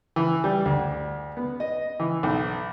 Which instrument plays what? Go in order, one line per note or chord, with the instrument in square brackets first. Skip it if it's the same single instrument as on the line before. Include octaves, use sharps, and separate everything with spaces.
[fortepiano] E3
G3
D2
B3
D#5
E3
B1